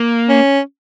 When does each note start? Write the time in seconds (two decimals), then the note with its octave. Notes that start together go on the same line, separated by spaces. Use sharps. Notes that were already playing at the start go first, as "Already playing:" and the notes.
Already playing: A#3
0.29 C#4